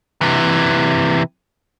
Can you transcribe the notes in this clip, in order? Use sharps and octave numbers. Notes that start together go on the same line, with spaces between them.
C3 E3